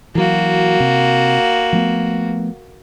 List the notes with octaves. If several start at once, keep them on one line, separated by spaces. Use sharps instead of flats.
E3 F#3 A#3 F#4
C3
F3 A3 B3